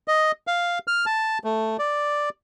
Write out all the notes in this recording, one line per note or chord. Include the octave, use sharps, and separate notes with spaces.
D#5
F5
F6
A5
A3
D5